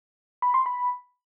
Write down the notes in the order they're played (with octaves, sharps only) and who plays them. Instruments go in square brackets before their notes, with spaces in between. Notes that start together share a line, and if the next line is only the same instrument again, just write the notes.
[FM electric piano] B5
C6
B5